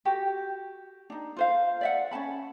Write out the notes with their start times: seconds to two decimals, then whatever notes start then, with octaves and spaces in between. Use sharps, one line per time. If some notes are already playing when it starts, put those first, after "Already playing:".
0.05 F#4 G4
1.10 D4 D#4
1.37 F4 C5 F5
1.81 D5 E5 F#5
2.11 C#4 D#4 A5 B5